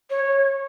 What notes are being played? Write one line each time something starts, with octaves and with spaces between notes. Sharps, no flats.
C#5